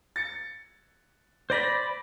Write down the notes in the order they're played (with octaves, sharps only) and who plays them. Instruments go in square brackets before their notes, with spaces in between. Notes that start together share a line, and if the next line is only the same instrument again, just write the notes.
[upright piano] A6 C#7
[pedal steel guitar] C5 D5 B5 [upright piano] G6 A#6 B6